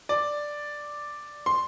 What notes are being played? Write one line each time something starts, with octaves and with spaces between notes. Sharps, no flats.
D5
C6